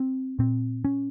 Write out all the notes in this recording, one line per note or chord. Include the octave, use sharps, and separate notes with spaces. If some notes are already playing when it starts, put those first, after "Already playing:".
Already playing: C4
A#2 C4
C#4